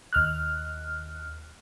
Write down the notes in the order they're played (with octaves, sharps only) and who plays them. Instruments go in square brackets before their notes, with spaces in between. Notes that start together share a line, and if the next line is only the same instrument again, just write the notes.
[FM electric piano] D#2 F6 F#6